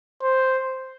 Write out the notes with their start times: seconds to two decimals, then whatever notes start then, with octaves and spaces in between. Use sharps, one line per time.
0.22 C5